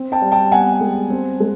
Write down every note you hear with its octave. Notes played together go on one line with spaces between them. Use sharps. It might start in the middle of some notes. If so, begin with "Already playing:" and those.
Already playing: C4
G5 A5
G3
G5 A5
B3 F#5 G#5
G#3
C4
G#3